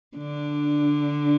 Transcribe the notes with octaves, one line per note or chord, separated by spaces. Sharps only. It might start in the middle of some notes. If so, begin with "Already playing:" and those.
D3 D4